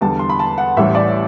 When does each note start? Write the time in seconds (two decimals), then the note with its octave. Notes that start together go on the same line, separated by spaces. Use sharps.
0.01 E2 D3 G3 A5
0.19 C6
0.29 B5
0.39 A5
0.58 F#5
0.77 A1 A2 E3 G3 E5
0.95 D5